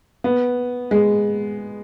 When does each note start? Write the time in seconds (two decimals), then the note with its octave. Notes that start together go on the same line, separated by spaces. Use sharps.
0.24 B3
0.91 G#3